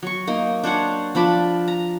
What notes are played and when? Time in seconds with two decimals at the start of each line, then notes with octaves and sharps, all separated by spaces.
0.03 F#3 C#6
0.27 A#3 D#4
0.64 D4 C5 C#5 F#5
1.15 F3 D4 B5 D6
1.68 A#5